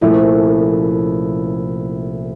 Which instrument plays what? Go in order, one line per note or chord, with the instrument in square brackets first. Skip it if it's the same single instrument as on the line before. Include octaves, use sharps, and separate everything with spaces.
[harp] C2 A#2 F3 A3 C#4 [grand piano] E4